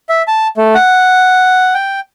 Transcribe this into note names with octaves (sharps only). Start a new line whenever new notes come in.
E5
A5
A3
F#5
G5